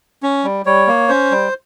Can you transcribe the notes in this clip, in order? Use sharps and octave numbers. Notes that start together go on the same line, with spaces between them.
C#4
G3
G3 C#5
A#3
C#4 C5
G3